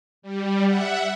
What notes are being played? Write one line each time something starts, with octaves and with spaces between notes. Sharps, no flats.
G3
E5 F#5